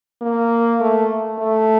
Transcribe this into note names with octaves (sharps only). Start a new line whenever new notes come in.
A#3
A3
A3